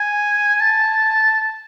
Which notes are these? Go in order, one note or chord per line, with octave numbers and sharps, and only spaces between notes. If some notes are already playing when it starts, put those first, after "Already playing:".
Already playing: G#5
A5